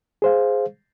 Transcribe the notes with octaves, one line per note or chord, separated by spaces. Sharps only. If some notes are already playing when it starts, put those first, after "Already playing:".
G#4 C5 F5